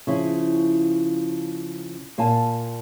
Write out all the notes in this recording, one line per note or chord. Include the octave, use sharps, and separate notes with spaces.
C#3 F3 E4
A#2 F5 G#5 A5